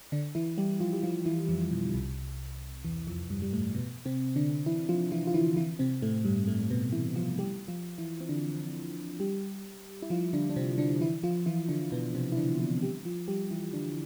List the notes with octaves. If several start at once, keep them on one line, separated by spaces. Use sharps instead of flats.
D3 D4
E3 E4
G3 G4
F3 F4
G4
F3 F4
E3 E4
F2 F3
B2
D3
C2 C3
E2 E3
F2 F3
G2 G3
G3
A2 A3
B2 B3
C3 C4
D3 D4
E3 E4
F3 F4
E3 E4
F4
E3 E4
E3 E4
C3 C4
A2 A3
G2 G3
A2 A3
A3
B2 B3
E3 E4
F3 F4
G3 G4
F3 F4
E3 E4
C4
D3 D4
G3 G4
E4
F3 F4
D3 D4
D4
C3 C4
D3 D4
E3 E4
F3 F4
E3 E4
D3 D4
B2 B3
C3 C4
E4
D3 D4
E3 E4
G3 G4
F3 F4
G3 G4
E3 E4
D3 D4